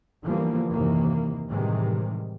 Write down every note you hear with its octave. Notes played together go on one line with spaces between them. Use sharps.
D3 E3 F3 G3 A#3 B3
F#1 D#2 C3 D#3 E3 A#3
A2 C3 D#3 E3 G3 G#3